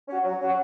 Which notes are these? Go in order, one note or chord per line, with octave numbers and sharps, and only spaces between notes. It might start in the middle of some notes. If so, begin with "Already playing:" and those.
C#4 F#4
F#3
C#4 F#4